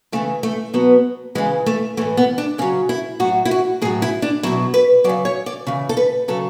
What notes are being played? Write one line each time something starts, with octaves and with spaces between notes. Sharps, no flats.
C#3 E3 A3
A3
B2 F#3 B3
C#3 E3 G#3
A3
A2 E3 A3
B3
D4
C#3 F#3 C#4
E4
A2 F#3 F#4
E4
F#4
A2 F#3 G#4
E4
D4
B2 F#3 E4
B4
F#3 D5
C#3
C#5
D5
C#3 E3
A4
B4
C#3 F#3 A4